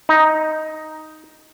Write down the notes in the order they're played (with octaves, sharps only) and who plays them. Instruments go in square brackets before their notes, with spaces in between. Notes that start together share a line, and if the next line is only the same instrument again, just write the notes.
[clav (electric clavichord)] D#4